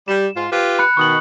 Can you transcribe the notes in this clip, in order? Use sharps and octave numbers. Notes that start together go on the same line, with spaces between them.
G3 E7
G#2 F4
F4 G4 B4
B5 F#6 C#7
B2 D#3 C#6 D#6 F#7